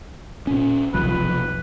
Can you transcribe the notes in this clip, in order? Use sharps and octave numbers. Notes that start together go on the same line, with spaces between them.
A#2 C#4
F1 B1 F3 B4